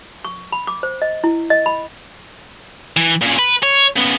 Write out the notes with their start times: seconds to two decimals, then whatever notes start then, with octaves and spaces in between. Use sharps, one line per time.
0.25 C#6
0.52 B5
0.67 D6
0.83 C5
1.02 D#5
1.24 E4
1.50 D#5
1.66 B5
2.97 E3
3.22 A#2 C#3
3.39 B4
3.63 C#5
3.96 C#3 B3